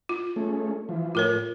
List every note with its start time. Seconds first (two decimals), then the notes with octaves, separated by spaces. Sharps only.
0.09 F4
0.36 G#3 A3 C#4
0.89 E3 F3
1.15 A2 F4 A#4 C#5